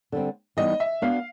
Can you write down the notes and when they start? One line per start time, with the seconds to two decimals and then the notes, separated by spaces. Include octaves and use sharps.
0.12 D3 G3 C4
0.57 E3 G3 B3 D#4 D#5
0.80 E5
1.02 B3 D4 F#4 F5